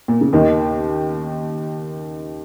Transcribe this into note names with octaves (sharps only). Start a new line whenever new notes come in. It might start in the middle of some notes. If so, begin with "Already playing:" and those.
A#2
C#3
D#2 D#3